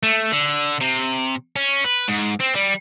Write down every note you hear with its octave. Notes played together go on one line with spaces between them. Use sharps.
A3
D3
C3
C#4
B4
G#2
C4
G3